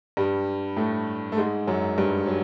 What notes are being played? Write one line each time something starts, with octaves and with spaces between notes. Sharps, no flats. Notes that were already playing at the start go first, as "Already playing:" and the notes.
G2 G3
A2 A3
A3
G#2 G#3
F#2 F#3
G2 G3
F#3